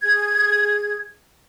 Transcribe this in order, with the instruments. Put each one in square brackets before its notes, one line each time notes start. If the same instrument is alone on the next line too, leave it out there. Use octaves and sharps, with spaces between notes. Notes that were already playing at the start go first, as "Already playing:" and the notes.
[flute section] G#4 G#6